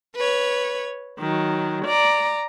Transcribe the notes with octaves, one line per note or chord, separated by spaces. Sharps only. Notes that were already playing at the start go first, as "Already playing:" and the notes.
B4 C#5
D#3 F#3
D5 A#5